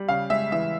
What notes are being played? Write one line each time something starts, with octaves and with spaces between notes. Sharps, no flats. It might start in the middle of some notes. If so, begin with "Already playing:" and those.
Already playing: G3
C#3 F5
G#3 E5
E3 E5